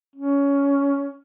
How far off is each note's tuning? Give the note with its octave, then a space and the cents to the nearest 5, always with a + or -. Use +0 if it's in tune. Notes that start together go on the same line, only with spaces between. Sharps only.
C#4 +15